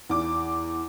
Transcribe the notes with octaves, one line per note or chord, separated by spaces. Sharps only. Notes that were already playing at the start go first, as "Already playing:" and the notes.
E2 D6